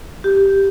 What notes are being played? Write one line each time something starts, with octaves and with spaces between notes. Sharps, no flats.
G4